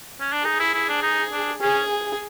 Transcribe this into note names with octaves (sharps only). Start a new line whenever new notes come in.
C#4
D4
D#4 G#4
E4
E4
D4
D#4
D4
C#4 G#4